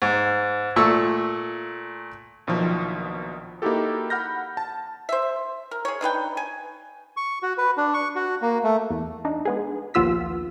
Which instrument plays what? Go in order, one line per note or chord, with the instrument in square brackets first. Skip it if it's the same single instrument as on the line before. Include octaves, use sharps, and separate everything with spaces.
[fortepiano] G#2
A#2 A3 C#6 E6
[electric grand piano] A#1 B2 D#3 F3 F#3
A#3 D#4 E4 F#4 G4 A4
F#5 B5 F6 G6 A#6
A5
[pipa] C5 E5
A#4
G#4 C#5
D4 D#4 B4 G5
G#5
[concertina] C#6
F#4
B4
D4
C#6
F#4
A#3
A3
[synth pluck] E2
D4 D#4
G#3 B3 G#4
A#1 D#2 B3 F4 E6 B6